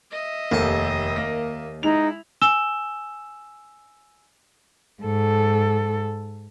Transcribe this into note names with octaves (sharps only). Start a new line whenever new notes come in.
D#5 E5
F1 D#2 A4 A5
A#3 A#6
G#3 D#4 E4 F7
G#5 E6 E7 G7
G#2 A4